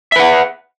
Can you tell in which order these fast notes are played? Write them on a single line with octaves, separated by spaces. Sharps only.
E5 B4 F#5